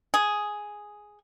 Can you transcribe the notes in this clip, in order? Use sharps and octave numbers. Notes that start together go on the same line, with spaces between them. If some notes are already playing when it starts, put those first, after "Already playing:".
G#4